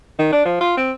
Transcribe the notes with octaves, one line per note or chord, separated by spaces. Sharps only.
D#3
D4
F3
F4
C4